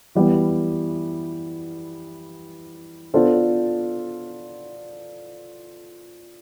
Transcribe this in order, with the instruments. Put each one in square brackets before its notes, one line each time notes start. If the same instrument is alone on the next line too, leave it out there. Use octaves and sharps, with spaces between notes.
[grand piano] E3 G3 B3
B3 D4 F4 A4 C5